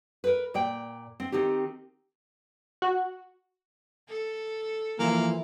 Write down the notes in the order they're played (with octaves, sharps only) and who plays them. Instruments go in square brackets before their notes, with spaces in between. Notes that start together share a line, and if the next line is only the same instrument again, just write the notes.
[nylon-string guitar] A#4 B4
A#2 D5 G5
C4
D#3 C4 D#4 G4
[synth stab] F#4
[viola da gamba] A4
[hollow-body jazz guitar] E3 F3 E4 [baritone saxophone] A#3